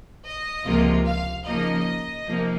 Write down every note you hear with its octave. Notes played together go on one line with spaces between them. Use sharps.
D#5
C#2 C3 F3 A#3 F4
F5
C#3 F3 A#3 D#4 D#5
C3 F3 A#3 D#4